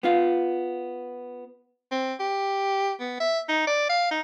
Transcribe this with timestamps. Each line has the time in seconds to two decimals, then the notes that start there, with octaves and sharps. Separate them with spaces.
0.03 B3 F4 F5
1.91 C4
2.20 G4
3.00 B3
3.20 E5
3.49 D#4
3.67 D5
3.89 F5
4.11 D#4